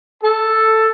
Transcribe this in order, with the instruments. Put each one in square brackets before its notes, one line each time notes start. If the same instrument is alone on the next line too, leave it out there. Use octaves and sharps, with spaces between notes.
[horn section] A4